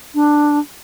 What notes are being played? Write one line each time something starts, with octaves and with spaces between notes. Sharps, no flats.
D4